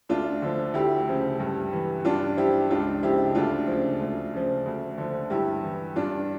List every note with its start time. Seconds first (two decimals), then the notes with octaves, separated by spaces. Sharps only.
0.09 D2 D4 F4
0.42 D3 F3
0.74 D2 E4 G4
1.08 C#3 F3
1.40 G2
1.73 E3
2.05 G2 D4 F4
2.37 F3 E4 G4
2.70 C#2 D4 F4
3.03 C#3 F3 E4 G4
3.35 D2 D4 F4
3.68 C#3 F3
4.01 D2
4.33 C#3 F3
4.66 D2
4.98 D3 F3
5.30 G2 E4 G4
5.63 E3
5.96 G2 D4 F4